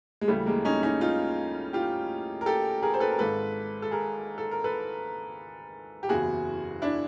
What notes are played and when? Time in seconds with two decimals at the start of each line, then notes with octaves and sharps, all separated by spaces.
0.21 G#3
0.28 D2 C#3 E3 G3 A3
0.46 G#3 A#3
0.65 C#4 D#4
0.83 C#4 D#4
1.01 D#4 F4
1.73 F4 G4
2.41 A#4
2.46 G4 A4
2.82 G#4 A#4
2.94 C5
3.00 A4 B4
3.12 A#4
3.19 G#1 G#2 D#3 A4 B4
3.82 A4
3.91 G#4 A#4
4.38 A4
4.51 A#4
4.64 A4 B4
6.03 G4
6.09 F#1 E2 C#3 E3 F#4 G#4
6.82 D4 E4